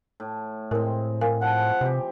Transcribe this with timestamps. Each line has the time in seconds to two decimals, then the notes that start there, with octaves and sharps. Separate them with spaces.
0.20 A2
0.71 A2 G#3 C4 A#4
1.21 A#4 F5 G#5
1.41 F3 F#5
1.81 C3 E3 G4